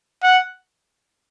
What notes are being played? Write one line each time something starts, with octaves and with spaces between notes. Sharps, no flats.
F#5